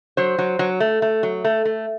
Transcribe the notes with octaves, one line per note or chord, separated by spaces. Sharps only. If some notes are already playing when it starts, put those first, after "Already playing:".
F#3 C5
F#3
F#3
A3
A3
F#3
A3
A3